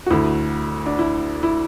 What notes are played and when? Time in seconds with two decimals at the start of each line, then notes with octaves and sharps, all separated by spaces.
0.06 F#4
0.10 D2 D3 E4
0.86 D4
0.99 E4
1.43 E4